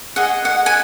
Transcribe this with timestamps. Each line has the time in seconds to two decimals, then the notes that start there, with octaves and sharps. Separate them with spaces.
0.16 G#4 D#5 F#5
0.45 F#5
0.66 G#5